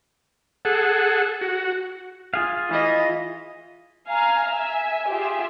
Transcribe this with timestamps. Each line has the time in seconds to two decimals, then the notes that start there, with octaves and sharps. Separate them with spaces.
0.65 G#4 A4 F#5
1.41 F#4
2.34 F4 G#4 F5
2.70 E3 D#5
4.09 F5 G#5 A#5 F6
4.50 E5 G#5
5.11 F4 G4 G#4 E5